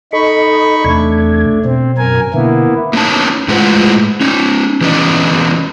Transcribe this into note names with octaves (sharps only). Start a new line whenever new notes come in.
D#4 A4 D#5 B5 C#6
E2 C3 A3 D4 G#6
B2 C4
F#2 A#4 G#5
B2 D3 A#3 B3 E4
A#3 B3 C#4 D#4 A5
A2 G#3 F4 B4 C5 F#5
C#4 D#4
E3 F#3 B3 C#4 D5 D#5